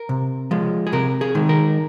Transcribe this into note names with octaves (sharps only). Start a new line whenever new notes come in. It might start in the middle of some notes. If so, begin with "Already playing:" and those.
Already playing: A#4
C3
F3 G#3
G#4
C3 A#4
G#4
D#3 G#3
A#4